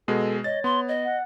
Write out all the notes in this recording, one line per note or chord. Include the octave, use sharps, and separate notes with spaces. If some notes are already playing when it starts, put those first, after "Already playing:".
B2 G#3 A4
C#5 D#5 A6
B3 C6
D#5
F#5